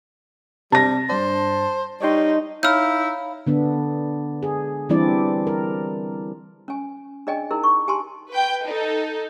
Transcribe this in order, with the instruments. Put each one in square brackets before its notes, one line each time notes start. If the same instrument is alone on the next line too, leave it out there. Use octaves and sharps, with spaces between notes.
[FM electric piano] C3 [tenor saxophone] G3 [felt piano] A5 A#6
[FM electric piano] G2 D4 [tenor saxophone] C5
[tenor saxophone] G3 [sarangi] D#4 [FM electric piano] C#5 G5 C6
[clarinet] D#4 [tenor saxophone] E4 [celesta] C#5 F5 B5 [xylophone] F6 G6
[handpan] D3 B3 D4
G#4
E3 G3 C4 D4 E4 D5
A#4
[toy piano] C#4 G#5
D4 G#4 D5 D#5 G5 G#5
D#4 E4 G#4 A#4
C#6
G4 G#5 A5 C6
[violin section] B4 G5
D#4 A4